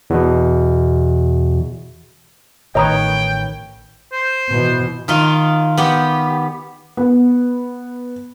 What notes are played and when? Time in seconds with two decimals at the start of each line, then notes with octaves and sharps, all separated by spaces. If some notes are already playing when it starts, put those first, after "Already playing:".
0.10 E2 B2
2.75 A1 D#3 B4 C#5 D#5 G5 A#5 D#6
4.12 C5
4.51 B2 E3
5.08 D#3 D#4 F4
5.77 B3 G4
6.97 B3